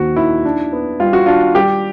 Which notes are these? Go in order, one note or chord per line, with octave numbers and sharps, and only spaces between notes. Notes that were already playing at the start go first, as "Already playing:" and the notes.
Already playing: D#2 D#3 C4 F#4
D#3 E4
D4
B3
G3 F4
F#4
D4 F4
G3 G4